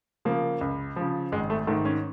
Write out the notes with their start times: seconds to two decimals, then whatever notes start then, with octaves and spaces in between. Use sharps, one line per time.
0.25 C#3 F3 A#3
0.61 C#2
0.96 C#3 F3
1.32 G#1 G#3
1.50 A3
1.67 G#2 D#3 A3
1.85 C#4